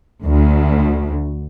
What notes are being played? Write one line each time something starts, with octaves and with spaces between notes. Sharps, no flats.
D2